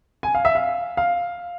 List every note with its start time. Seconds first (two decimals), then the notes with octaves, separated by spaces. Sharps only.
0.23 G#5
0.35 F5
0.45 E5
0.55 F5
0.97 F5